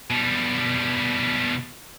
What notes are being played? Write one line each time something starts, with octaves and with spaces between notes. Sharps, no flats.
B2 G3